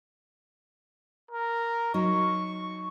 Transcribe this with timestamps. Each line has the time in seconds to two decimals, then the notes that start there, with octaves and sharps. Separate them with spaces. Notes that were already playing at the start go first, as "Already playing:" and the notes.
1.31 A#4
1.94 F#3 D#4 C#6